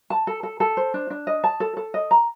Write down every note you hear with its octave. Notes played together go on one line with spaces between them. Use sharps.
A5
A4
A4
A4
C5
D4
D4
D#5
A5
A4
A4
D#5
A#5